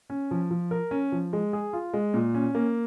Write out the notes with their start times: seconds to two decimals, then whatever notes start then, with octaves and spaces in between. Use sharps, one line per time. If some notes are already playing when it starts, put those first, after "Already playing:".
0.10 C#4
0.31 F3
0.51 F3
0.71 A#4
0.91 C#4
1.12 F3
1.33 G#3
1.53 G#4
1.73 F4
1.93 G#3
2.14 A#2
2.34 C#4
2.55 A#3